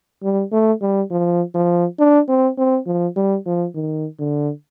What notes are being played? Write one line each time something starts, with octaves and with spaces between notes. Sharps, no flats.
G3
A3
G3
F3
F3
D4
C4
C4
F3
G3
F3
D#3
D3